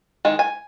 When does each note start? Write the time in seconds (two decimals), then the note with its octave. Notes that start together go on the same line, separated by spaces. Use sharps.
0.25 D#3 G#3
0.39 G#5